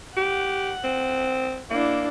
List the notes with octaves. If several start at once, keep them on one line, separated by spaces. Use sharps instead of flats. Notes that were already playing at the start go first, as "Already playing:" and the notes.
G4 F#5
C4
A#3 D4 E4